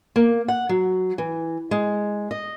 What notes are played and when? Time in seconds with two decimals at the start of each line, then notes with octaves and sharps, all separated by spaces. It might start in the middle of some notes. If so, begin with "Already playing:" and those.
0.16 A#3
0.48 F#5
0.69 F#3
1.18 E3
1.71 G#3
2.31 D#5